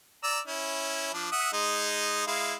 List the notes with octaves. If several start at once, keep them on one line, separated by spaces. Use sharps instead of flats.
D5 A#5 E6
C#4 E4
F3 D4
E5 F#5 D#6
G#3 D#4
G#3 E4 F5